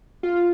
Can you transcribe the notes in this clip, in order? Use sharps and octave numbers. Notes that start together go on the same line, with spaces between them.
F4